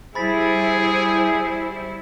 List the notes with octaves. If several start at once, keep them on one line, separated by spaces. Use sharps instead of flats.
G3 E4 G#4 C5 B5 A6 B6